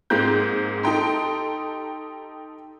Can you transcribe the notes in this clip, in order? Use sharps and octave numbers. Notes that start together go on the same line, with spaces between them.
G#2 G#3 A#3 C4 A#5 G6
D#4 G4 A4 G5 A#5 C6